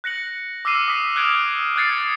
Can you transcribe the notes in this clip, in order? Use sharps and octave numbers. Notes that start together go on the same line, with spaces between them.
F#6 A#6 C#7 F#7
D6 E6 F6 A#6 C7 D#7
D#6 B6 D#7
F6 F#6 G#6 D7 E7 F7
D#6 F#6 G#6 A6 C7 C#7